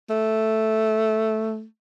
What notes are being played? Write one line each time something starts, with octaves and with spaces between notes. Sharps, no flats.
A3